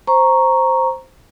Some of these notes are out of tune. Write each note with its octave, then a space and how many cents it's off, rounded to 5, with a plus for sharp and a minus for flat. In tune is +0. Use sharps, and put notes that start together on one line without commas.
C5 +0 A#5 +0 C#6 +0